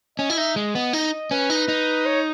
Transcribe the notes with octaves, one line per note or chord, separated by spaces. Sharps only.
C#4 D#5
E4
D#4 E5
G#3 D#5
B3
D#4
C#4 B4
D#4
D#4
C#5